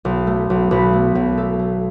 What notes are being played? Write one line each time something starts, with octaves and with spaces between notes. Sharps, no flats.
B1
A3
B1
B1 B4
A3
B1
A3 A4
A3